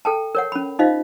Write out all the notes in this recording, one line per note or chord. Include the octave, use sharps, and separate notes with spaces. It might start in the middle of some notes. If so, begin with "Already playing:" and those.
A4 G5 A5
A#4 C#5 F#5
C#4 B5
D#4 F4 C5 D#5 F5